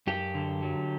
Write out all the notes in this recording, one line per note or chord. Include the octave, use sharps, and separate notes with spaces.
F#2 G4
D3
F#3